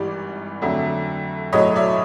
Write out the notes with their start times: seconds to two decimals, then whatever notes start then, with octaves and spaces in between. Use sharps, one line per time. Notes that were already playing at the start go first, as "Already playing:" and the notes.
Already playing: G#1 G2 E3 G3 D5
0.61 F2 D3 F#3 A3
1.53 B1 A2 F#3 A3 C#5 D#5
1.76 D5 E5